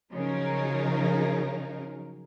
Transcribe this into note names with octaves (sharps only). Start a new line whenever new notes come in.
C#3 F3 F#3 D#4 A#4